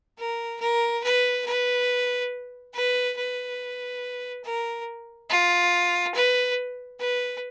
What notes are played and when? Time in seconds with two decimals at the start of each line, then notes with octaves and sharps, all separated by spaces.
0.18 A#4
0.60 A#4
1.03 B4
1.46 B4
2.73 B4
3.17 B4
4.44 A#4
5.30 F4
6.14 B4
6.99 B4